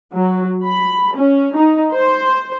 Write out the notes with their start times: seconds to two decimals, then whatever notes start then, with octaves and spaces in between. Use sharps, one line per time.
0.13 F#3
0.66 B5
1.16 C#4
1.57 D#4
1.92 C5